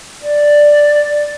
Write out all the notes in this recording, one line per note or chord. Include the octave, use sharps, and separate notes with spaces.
D5